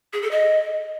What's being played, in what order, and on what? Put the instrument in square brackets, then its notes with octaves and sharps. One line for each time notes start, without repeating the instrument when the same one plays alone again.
[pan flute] G#4
A4
D#5